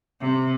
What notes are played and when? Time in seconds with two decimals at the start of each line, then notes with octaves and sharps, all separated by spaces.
0.20 C3